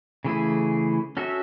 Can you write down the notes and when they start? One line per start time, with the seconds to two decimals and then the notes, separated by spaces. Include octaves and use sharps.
0.24 C#3 E3 A3 E4 G#4
1.17 C#4 F#4 A4 E5